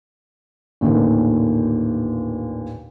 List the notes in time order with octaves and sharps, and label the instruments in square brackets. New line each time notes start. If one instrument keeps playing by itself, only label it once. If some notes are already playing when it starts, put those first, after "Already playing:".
[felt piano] A1 D#2 A#2 D3 D#3